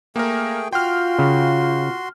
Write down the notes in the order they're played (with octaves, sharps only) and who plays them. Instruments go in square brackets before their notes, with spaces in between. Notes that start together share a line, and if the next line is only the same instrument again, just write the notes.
[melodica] A3 G#4 G5 [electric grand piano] A#3 A#4
[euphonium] F4 [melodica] F#4 C6 [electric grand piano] G5 F6
[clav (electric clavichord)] C#3